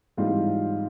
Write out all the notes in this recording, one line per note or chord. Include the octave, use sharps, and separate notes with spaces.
G#2 E3 G3 C4 F4